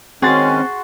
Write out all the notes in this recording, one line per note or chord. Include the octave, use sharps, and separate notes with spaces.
D#3 G#3 C4 C#4 F#4 G#4 C6 A6